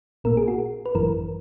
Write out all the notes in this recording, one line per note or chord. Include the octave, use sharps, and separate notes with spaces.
A#1 A#2 A#3 A#4
G#4
F#4
B4
G#1 F#2 E3 A#4